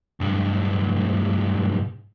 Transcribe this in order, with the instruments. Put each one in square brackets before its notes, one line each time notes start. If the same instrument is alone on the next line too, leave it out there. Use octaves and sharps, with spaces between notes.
[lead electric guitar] B1 G2